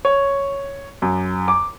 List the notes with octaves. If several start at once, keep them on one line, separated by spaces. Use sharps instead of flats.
C#5
F#2
D6